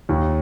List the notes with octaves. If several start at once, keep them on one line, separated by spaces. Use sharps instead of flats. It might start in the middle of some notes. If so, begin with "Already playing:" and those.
D#2 D#3